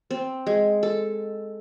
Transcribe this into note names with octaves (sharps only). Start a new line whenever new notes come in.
C4
G#3
A4